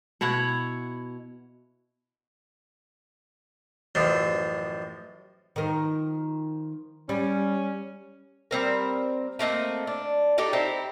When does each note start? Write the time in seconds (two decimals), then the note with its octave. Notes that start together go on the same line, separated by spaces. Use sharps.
0.21 B2 E4 C#5 F#5
3.95 A1 F#2 F3
5.56 D#3 F3 A#4
7.09 G3 C#4
8.51 G3 C4 A#4
9.39 A3 A#3 C4 D#5
9.87 D4
10.38 D4 D#4 G4 A4
10.53 C4 D#4 E4 G4